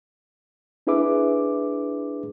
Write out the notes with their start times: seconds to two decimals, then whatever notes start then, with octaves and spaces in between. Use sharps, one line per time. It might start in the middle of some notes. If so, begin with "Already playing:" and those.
0.87 D4 E4 G#4 B4 E5 D6